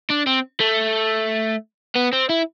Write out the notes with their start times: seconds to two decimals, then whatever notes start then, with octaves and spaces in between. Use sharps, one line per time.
0.10 D4
0.27 C4
0.60 A3
1.96 B3
2.13 C4
2.29 E4